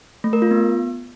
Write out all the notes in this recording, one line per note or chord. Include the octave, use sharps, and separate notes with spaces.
A3
A#4
F4
B3